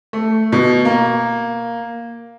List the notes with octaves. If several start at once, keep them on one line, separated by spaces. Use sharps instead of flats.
A3
B2
A#3